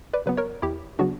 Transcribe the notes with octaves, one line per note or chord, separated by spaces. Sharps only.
B4 D5
C#3 F#3 B3 B4
A#4 C#5
E2 E4 G4
C#3 F#3 B3 D4 F#4